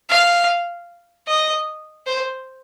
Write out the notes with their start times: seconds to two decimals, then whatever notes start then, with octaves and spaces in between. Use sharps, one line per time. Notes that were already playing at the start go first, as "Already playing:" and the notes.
0.10 F5
1.27 D#5
2.06 C5